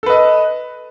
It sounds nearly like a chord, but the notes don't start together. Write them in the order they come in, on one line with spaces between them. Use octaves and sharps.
A4 B4 D#5